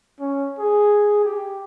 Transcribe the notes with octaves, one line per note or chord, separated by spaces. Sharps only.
C#4
G#4
G4